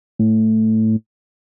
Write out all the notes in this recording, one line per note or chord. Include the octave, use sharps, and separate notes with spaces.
A2